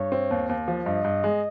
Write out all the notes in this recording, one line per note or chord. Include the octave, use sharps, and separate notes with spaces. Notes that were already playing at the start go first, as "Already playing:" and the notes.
Already playing: G2 C#5
C4
D#2
D#2
F3
G2 D#5
G2
G#3